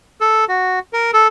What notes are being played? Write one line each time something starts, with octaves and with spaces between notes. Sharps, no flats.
A4
F#4
A#4
A4